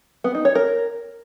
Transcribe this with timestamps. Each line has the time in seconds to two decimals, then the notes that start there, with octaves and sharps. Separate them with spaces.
0.24 B3
0.35 D#4
0.45 C#5
0.55 A#4